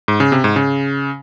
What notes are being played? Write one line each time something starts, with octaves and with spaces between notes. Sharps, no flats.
G#2
C#3
C3
G#2
C#3